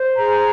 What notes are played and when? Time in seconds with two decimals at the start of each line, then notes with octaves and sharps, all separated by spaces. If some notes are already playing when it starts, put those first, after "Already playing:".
Already playing: C5
0.17 G#4 A#5